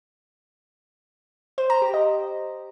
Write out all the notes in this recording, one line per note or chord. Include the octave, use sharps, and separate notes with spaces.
C5
A#5
G4
D#5